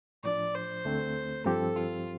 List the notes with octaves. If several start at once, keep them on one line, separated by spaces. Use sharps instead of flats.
A2 F3 D4 D5
C5
D2 D3 A3 C4
G2 F3 C4 G4 A4
F4